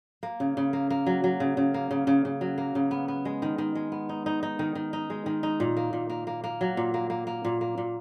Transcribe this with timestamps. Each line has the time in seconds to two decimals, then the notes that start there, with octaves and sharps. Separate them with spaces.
0.23 A#3
0.40 C#3
0.57 C#3
0.73 A#3
0.90 A#3
1.07 F#3
1.24 F#3
1.40 C#3
1.57 C#3
1.74 A#3
1.91 C#3
2.07 C#3
2.25 C#3
2.41 F#3
2.58 A#3
2.75 C#3
2.91 B3
3.08 B3
3.25 G#3
3.42 D#3
3.58 D#3
3.75 G#3
3.92 B3
4.09 D#4
4.26 D#4
4.43 D#4
4.59 D#3
4.75 D#3
4.93 D#4
5.10 G#3
5.26 D#3
5.43 D#4
5.60 A#2
5.77 A#3
5.93 A#2
6.10 A#3
6.27 A#3
6.44 A#3
6.61 F#3
6.77 A#2
6.94 A#3
7.10 A#3
7.27 A#3
7.45 A#2
7.61 A#3
7.78 A#2